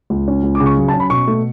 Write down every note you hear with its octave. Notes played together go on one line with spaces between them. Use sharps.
C#2
C#4
C#2
D6
C#3
C#6
F#3
A5
C#4
B5
B2 C#6
A3